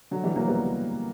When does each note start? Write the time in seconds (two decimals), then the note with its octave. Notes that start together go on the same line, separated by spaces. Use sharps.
0.11 D3 F#3
0.23 E3 G3
0.36 F#3 A#3
0.48 G3 B3